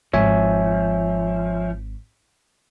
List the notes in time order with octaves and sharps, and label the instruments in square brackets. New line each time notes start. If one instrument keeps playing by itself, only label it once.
[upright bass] G#1 [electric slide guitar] F3 [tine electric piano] C#5 E5 G#5